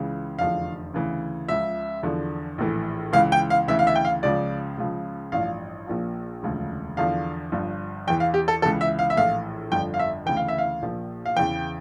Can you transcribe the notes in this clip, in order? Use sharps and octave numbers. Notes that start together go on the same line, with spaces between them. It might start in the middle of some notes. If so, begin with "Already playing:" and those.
Already playing: C#2 C#3 E3
F1 E2 D3 F3 F5
D2 C#3 E3
C#2 C#3 F3 E5
E2 D3 F3
A#1 A2 E3
C#2 C#3 E3 F5
G5
F5
D2 C#3 E3 E5
F5
E5
G5
F5
C#2 C#3 F3 D5
C#2 C#3 F3
A1 G2 F3 F5
A#1 A#2 F3
E1 D2 C#3 F3
E2 D3 F3 F5
G1 G2 F3
E2 E3 G5
F5
G4
A4
C#2 C#3 E3 A4
E5
F5
E5
A#1 A2 E3 F5
G1 F2 D3 F3 G5
F5
E5
D2 C#3 E3 G5
F5
E5
F5
A#1 A#2 F3
F5
E2 C#3 E3 G5